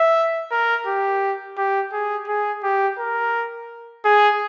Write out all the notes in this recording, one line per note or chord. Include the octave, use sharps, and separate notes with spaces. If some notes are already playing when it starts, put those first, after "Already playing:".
Already playing: E5
A#4
G4
G4
G#4
G#4
G4
A#4
G#4